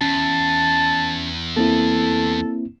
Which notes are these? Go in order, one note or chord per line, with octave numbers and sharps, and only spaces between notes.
E2 C#4 A5
A#3 C4 E4 A4